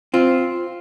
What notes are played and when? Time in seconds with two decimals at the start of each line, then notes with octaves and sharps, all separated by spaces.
0.14 C4 F4